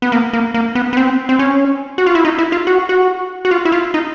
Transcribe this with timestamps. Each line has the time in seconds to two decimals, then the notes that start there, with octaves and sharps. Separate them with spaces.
0.02 B3
0.12 A#3
0.33 A#3
0.54 A#3
0.75 B3
0.93 B3
0.97 C4
1.29 C4
1.39 C#4
1.98 F#4
2.06 F4
2.15 E4
2.25 D#4
2.38 E4
2.52 F4
2.67 F#4
2.89 F#4
3.45 F#4
3.51 F4
3.65 E4
3.72 F4
3.94 D#4